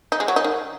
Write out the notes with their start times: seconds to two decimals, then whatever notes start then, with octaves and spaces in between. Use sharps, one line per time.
0.12 D#4
0.20 G#3
0.28 F#3
0.36 D#4
0.44 D#3